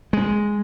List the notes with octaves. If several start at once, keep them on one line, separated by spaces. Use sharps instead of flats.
G#3